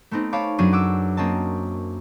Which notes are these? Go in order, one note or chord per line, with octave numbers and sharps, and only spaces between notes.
A3 B3 C4 D#4
C#5 F5 A5 B5 D6
F#2 F#3 C#4 D4 G#4 D#7
F#5 D6 E6
A#3 C4 C#4 D#5 A5